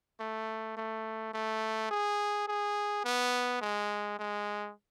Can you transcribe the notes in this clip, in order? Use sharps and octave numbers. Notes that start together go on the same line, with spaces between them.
A3
A3
A3
G#4
G#4
B3
G#3
G#3